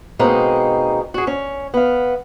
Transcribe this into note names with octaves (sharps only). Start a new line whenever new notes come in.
B2 G#3 A#3 C4 D#4
F#4 G#4
C#4
B3 F5